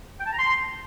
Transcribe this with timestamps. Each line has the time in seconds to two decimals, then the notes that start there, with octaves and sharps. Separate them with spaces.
0.19 G5
0.26 A5
0.32 A#5
0.39 C6